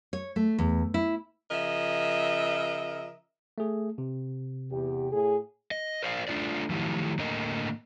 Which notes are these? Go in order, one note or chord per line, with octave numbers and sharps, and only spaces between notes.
C#5
A3
E2
E4
C#3 F3 A#4 D#5 E5
A3 G#4
C3
E2 G4
A2 G#4
D#5
A#4 C5 D5 E5 F5
A3 D4 F4 D5
D#3 F3 F#3 A3 E4 G4
A2 D3 A#3 A#4 D#5